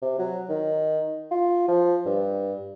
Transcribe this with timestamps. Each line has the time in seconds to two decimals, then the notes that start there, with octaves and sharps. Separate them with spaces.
0.02 C3
0.19 F#3
0.49 D#3
1.31 F4
1.68 F3
2.06 G2